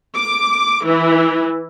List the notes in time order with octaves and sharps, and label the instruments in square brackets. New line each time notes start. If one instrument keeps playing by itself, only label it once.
[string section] D6
E3